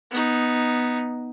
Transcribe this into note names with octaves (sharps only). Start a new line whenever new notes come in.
B3 D#4